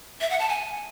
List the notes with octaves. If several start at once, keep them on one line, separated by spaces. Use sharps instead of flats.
E5
F#5
A5
G#5